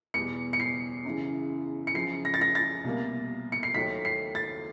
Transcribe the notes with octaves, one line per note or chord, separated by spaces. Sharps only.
E2 B2 G3 C#7
C#7
C7
F#2 C#3 E3
C#7
F#2 C#3 F3 C7
A#6
A6
A#6
A6
C2 B2 G3 A#3
C#7
C7
D#2 D#3 F#3 A3 B6
C7
A6